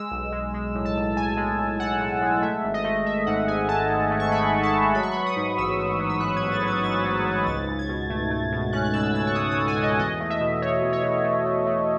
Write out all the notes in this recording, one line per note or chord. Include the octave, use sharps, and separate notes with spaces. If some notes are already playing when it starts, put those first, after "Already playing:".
Already playing: G#3 E6
B1
G#3
G#3
A2
A5
B1
B1 G#5
G#3
A2
A2 F#5
A2
G#3
A3 E5
G#1
D#5
A3
G#1 E5
G#2 F#5
G#1 G#5
G#2 A5
G#2
A3
C#6
A3 B5
A3
A5
A3
F#3 B5
C#6
B3 B5
D#6
G#2
A1 E6
G#2
F#3
E6
G#2 F#6
A1 G#6
A6
F#3 G#6
G#2 A6
F#3
G#2
C#2 A6
C#2
G#6
B2
A3
A3
B2
C#4 F#6
F#6
B2 E6
B2 E6
C#6
B2 D#6
D#6
B2
G#5
B2
D#5
E2 D#5
A3
E5
B2
A3 C#5
E2
C#5
B2
A3
A3
A3